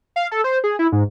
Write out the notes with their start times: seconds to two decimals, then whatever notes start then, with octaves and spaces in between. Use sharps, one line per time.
0.16 F5
0.31 A4
0.44 C5
0.64 G#4
0.79 E4
0.92 G#2